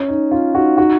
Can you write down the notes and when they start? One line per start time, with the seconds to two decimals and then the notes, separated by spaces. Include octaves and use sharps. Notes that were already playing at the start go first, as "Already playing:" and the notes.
Already playing: C#4
0.09 D#4
0.31 C#4 F4
0.55 D#4 F#4
0.78 D#4 F#4